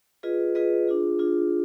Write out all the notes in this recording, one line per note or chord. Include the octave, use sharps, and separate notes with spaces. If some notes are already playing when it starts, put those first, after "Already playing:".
F4 G#4 B4 D#5
F4 G#4 B4 D#5
D4 F4 G#4
D4 F4 G#4